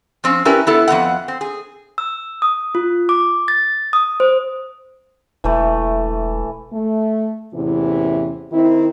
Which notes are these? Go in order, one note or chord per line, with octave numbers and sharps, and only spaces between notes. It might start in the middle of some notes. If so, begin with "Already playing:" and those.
F3 C4 C#4
C#4 E4 G4 A#4 B4 D5
B3 E4 A4
F2 E3 B3 F#5
C4
G#4
E6
D#6
F4
D6
A6
D#6
C5
E1 E3 A3
A3
E2 A2 C3 E3 C#4
D#3 C4 E4